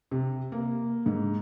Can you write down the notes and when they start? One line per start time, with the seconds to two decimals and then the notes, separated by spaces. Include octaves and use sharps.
0.11 C3
0.52 A#3
1.06 G#2